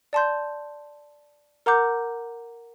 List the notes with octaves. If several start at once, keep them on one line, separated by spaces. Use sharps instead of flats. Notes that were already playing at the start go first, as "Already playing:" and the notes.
D5 A5 C6 G6
A#4 F#5 A#5 D6 G6